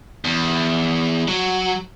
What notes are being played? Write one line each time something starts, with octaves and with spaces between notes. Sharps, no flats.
E2
F#3